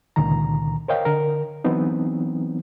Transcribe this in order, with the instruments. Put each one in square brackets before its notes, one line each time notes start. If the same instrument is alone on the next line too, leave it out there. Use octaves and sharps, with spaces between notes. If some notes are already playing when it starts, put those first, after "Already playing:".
[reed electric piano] C#2 A#2 D3 D#3 A#5
A#4 C5 C#5 D#5 F5 G5
D3 A#4
E3 F#3 B3 C4 D#4